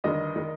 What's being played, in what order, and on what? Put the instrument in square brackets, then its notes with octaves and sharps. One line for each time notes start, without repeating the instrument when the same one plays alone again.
[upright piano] G1 G2 D#3 D#5
D#3